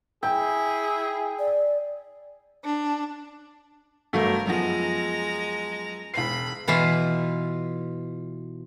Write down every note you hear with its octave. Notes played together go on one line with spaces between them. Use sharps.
E4 G#4 G5
D5
D4
G1 F#3 A3 A#4
F#2 F3 G#3 B3 A#5
E1 B5 C7
B2 E3 E4 F4